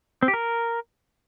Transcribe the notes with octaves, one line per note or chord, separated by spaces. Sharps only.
C4
G4
A#4